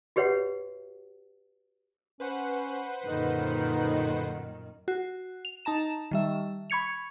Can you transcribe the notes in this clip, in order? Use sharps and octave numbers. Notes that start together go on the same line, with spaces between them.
F#4 G4 B4 C#5 E5 F#5
C#4 B4 C5 F#5
F#2 A#2 D3 D#3 D#4
F#4
F7
D#4 A5 A#5 E7
D#3 G3 E5
B5 C#6 G#6 C#7 F7